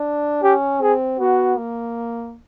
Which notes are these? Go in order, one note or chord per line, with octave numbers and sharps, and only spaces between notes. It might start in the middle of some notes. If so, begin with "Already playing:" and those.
Already playing: D4
C#4 G4
C4 G#4
B3 F#4
A#3